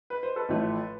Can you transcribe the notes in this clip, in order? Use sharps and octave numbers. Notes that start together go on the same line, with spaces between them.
B4
C5
A4 B4
A1 A2 F3 A3